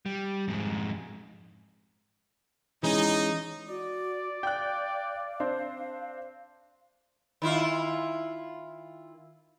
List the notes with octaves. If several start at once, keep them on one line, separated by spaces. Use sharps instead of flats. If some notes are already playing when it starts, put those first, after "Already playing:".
G3
F2 G#2
E3 G#3 C#4 D#4
F#4 D5
F5 G5 F#6
C4 D4 C5
D#3 E4 F4